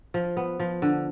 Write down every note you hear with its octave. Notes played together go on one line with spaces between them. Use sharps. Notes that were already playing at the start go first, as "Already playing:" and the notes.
F3
B3
F3
D3